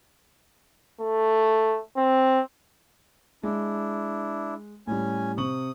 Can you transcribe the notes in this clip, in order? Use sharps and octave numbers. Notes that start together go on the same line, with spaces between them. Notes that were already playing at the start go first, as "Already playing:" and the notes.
A3
C4
G#3 D4 E4
A2 G3 C#4 G#5
C3 C#6 D#6 F#7